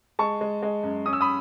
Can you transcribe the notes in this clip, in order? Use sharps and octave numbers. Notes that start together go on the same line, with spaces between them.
G#3 A5 C#6
G#3
G#3
F#2
C#4 D#6
E6
B5 D#6